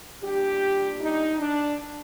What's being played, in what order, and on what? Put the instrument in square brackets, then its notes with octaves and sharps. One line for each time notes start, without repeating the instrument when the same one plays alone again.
[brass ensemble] A#2 G3 D4 G4
D#4
D4